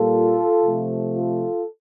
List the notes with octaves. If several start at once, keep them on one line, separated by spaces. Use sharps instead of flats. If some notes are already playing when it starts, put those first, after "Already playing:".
Already playing: A#2 G3 A#3 F4 A4
C3 F3 A3
F4 A4